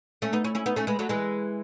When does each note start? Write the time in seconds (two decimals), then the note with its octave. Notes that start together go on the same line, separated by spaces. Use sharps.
0.22 A3 C#4
0.33 B3 D#4
0.44 C#4 E4
0.55 C#4 E4
0.66 B3 D#4
0.76 A3 C#4
0.87 G#3 B3
0.99 F#3 A3
1.09 E3 G#3